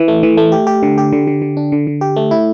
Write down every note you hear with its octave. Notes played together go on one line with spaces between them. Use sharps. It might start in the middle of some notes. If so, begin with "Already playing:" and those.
Already playing: E3
A3
E3
A3
G4
G4
D3
G4
D3
D3
D3
D4
D3
D3
G4
A3
E4